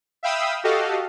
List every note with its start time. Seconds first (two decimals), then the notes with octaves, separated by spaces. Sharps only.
0.23 E5 F5 G5 B5 D#6 E6
0.64 F#4 G4 A4 D#5 F5